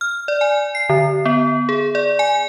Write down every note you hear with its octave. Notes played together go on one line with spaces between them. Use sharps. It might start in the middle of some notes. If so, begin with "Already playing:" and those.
F6
D5
G#5
C7
D3
B3
G#4
D5
G#5